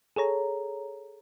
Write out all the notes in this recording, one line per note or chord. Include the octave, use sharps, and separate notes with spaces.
G#4 A4 C#5 A#5